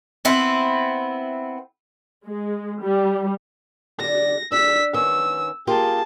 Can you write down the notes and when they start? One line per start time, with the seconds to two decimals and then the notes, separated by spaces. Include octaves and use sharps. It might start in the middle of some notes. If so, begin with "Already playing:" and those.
0.25 B3 C4 E4
2.26 G#3
2.81 G3
4.00 D3 D5 A#6
4.52 D4 E6 B6
4.94 D#3 B3 C#4 E6
5.67 A#3 F4 G4 G#4 A5